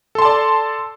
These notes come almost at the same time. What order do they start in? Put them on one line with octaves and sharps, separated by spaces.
A4 C6 A5 D5